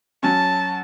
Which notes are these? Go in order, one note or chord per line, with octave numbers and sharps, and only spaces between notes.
F#3 C#4 A5